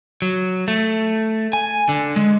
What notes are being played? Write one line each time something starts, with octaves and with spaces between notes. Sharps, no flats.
F#3
A3
G#5
D3
G#3